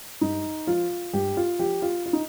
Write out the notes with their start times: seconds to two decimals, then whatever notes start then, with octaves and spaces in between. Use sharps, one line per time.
0.21 G2 D#4
0.67 F3 F4
1.13 G2 G4
1.37 F4
1.59 F3 G4
1.82 F4
2.06 F4
2.13 D#4